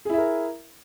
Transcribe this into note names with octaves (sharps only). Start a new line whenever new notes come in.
E4 G#4 A#4 E5